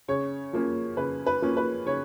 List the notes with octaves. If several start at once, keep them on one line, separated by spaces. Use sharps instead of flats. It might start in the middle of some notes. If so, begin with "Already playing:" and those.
C#3 C#5
F3 A#3 C#4
C#3 B4
B4
F3 A#3 C#4
B4
C#3 C#5